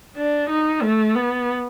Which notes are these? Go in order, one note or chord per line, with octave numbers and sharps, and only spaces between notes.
D4
D#4
A3
B3